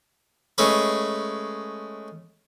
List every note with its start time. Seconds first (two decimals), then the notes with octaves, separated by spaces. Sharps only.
0.58 G#3 A3 C#4 B4